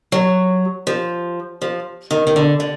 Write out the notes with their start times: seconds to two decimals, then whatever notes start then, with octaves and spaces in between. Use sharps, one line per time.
0.12 F#3
0.87 F3
1.62 F3
2.11 D#3
2.27 D#3
2.36 D3
2.60 D3